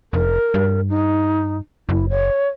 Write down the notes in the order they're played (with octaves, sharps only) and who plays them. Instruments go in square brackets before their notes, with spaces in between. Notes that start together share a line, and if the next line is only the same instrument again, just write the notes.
[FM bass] F1 [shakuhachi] A#4
[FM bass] G2
[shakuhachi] D#4
[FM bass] F#1 [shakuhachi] E4
[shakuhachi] C#5